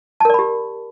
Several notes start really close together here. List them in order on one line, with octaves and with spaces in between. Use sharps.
A5 A#4 D5 B5 G4